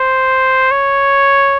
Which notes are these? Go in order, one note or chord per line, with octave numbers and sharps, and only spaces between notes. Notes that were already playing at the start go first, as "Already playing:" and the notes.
Already playing: C5
C#5